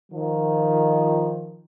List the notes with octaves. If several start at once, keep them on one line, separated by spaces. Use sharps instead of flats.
D#3 F3